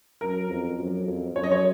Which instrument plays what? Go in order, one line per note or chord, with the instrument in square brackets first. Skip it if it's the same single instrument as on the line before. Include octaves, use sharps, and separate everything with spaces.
[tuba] F#2 [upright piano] A#4
[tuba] F2
F#2
F2
[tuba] F#2 [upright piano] C#5
[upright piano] D#5
C#5